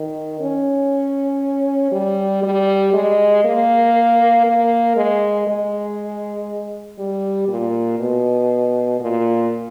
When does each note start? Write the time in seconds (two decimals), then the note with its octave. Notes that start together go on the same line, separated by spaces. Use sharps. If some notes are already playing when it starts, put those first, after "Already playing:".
Already playing: D#3
0.41 C#4
1.92 G3
2.43 G3
2.94 G#3
3.45 A#3
4.46 A#3
4.96 G#3
5.47 G#3
6.99 G3
7.49 A#2
7.99 B2
9.00 A#2